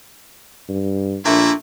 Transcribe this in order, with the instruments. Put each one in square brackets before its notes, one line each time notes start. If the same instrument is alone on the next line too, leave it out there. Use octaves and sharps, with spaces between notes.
[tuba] G2
[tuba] A#1 [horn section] A#2 A3 E4 [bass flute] D4